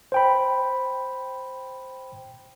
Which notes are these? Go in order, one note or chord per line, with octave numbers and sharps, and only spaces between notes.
C5 G5 B5